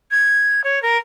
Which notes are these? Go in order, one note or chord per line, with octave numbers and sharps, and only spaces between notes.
G#6
C#5
A#4